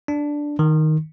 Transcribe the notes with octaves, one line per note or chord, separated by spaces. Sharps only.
D4
D#3